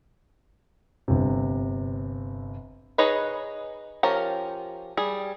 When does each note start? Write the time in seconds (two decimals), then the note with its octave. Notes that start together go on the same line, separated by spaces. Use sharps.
1.08 G1 C3
2.98 D#4 G#4 B4 C#5 D#5
4.03 F3 C#4 G4 A#4
4.97 G3 G#4